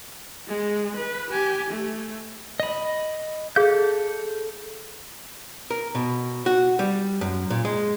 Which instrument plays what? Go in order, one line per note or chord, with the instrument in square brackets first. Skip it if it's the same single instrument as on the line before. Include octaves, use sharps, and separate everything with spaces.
[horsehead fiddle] G#3
B4
G4 G#5
A3
[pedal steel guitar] D#5 B5
[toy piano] G#4 F5 [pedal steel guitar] A4 G6
[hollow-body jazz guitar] A#4
B2
F#4
G3
F#2
A#2
G#3